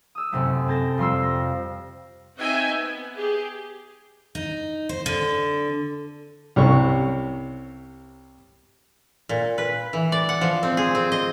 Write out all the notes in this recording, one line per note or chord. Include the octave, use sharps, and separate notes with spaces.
D#6 E6
F#2 C3 A3
C4 A4 A5 G6 A#6 E7
F2 G3 C6 E6
A#6
C4 D#4 F#4 E5 G5 G#5
B3
G4 G#4
D#4
C5
D3
C2 C3 C#4 C#6
A#2
B4
E3
D5
F#5
F3
C4
G#4
C4
D#5